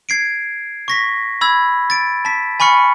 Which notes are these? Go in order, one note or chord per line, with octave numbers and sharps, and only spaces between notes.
G#6 C7 D7
C#6 A#6 B6
B5 E6 G#6
A6 D7
A5 B6
G#5 B5 C#6 F6 C#7